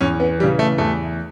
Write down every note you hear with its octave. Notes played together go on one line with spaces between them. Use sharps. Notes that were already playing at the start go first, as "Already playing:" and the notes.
E2 C#4
B3
C#3 E3 G3
A3
E2 A3